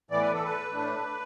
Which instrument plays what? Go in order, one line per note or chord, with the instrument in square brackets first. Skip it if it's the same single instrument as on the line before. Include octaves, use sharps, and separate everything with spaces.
[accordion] A2 E3 B3 D5
B4
A4
B4
A2 A3 D4